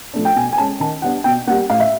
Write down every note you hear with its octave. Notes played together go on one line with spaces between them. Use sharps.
F3 A3 D4
G5
B2 G#5
G#5
G#3 C#4 A5
D#3 A5
G3 B3 D4 F#5
B2 G5
G3 A#3 F#5
A2 F5
E5